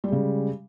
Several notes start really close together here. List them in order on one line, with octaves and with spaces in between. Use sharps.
G3 G#3 C#3